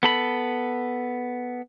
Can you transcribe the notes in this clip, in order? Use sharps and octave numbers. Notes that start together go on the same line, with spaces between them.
B3 A4 B5